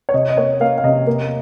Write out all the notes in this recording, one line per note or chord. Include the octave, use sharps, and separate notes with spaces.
C#5
C3 D#5
D#5
A#3 C#5
A#3 F5
F5
C3 D#5
A#3